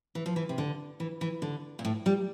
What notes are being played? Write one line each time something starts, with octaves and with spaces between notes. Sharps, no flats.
E3
F3
E3
C3
D3
E3
E3
D3
A#2
A2
G3